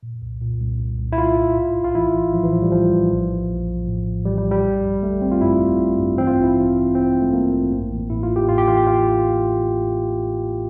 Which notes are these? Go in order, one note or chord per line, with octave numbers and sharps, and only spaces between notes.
A#2
C2
A#2
C2
C2
C2
E4
C2 F4
C2
A2
A#1
F4
E3 E4
E3
A2 F3
E3
A2 F3
G3
A2 F3
A2
A#1
A#1
A#1
A#1
A2
A#1
E3 G3
G3
A#1
G3
G1
G2
G1 A3
G1 C4
F4
G2 E4
G1
G2
G2
E3 C4
F4
A1
E4
F4
E3
A1
A1 C4
G2
A3
G2 A#3
A1
A1
A1
A2 E4
F4
A1
G4
A2 F4
G4
E3 F4
G4
A1 F4